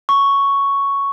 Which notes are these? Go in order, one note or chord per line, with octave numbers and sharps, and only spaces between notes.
C#6